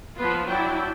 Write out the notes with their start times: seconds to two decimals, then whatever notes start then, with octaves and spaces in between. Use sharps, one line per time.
0.15 F3 B3 F4 B4
0.46 F#3 D4 E4 D5 G5